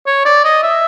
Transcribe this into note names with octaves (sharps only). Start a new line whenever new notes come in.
C#5
D5
D#5
E5